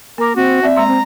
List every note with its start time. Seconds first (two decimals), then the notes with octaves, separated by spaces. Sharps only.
0.18 A#3 A#4 D6
0.36 C4 F#4
0.63 C4 D5 E5
0.76 G#3 A#3 A#5 C6
0.88 C4